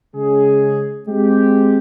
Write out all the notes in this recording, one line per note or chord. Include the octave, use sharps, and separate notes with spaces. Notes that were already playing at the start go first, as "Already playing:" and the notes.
C#3 G#3 C#4 G#4
G#3 C4 G4